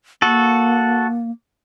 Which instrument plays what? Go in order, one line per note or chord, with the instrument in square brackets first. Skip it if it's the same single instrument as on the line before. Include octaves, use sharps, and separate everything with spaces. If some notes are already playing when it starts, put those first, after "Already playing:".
[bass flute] A#3 [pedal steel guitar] F#4 A4